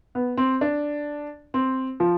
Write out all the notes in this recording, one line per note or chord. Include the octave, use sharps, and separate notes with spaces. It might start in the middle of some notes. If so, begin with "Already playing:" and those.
B3
C4
D4
C4
F3